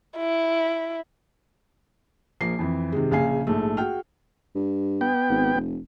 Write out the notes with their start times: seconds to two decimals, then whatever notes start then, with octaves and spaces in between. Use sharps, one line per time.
0.17 E4
2.41 A#1 F3 A#3 C7
2.59 F2 E3
2.92 C3 D#3 G#3
3.11 A#1 C#3 F5 G#5 C7
3.47 A#1 G#2 A3
3.77 F#4 G#4 G5 F6
4.55 G2
5.01 B3 G5
5.29 G#1
5.54 F1